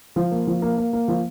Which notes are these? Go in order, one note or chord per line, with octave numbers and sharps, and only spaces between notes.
F3
A#3
F3
A#3
A#3
A#3
F3